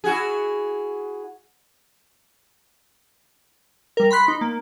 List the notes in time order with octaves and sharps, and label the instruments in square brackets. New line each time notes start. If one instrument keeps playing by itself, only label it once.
[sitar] E4 F#4 G#4
[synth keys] G3 A#4
B5 C6 F#6 B6
D#4
A#3